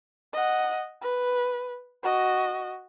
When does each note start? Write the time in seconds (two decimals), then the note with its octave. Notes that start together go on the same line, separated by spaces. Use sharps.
0.34 D#5 F#5
1.02 B4
2.03 F#4 D#5